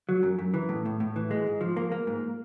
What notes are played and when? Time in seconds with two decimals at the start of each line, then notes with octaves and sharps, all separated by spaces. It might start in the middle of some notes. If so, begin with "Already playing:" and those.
0.09 F#3
0.23 F#2
0.39 F#2
0.54 E3
0.69 A2
0.85 A2
1.00 A2
1.16 E3
1.31 G#3
1.46 G#2
1.61 F3
1.77 A#3
1.92 A#3
2.07 G#2